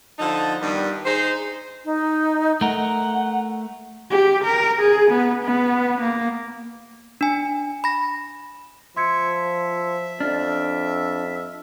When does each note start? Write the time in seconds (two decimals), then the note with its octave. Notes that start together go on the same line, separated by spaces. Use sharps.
0.19 D3 F3 D#4 A5
0.61 G2 D#3 G3 B3 B4
1.05 D#4 G#4 C5
1.85 D#4
2.61 A3 A#4 F#5
4.10 G4
4.44 A#4
4.80 G#4
5.11 B3
5.44 B3
6.01 A#3
7.21 D4 G#5
7.84 B5 A#6
8.96 F3 E5 C6 G#6 C#7
10.20 F2 D4 F6